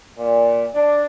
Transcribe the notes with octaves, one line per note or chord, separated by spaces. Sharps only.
A#2
D4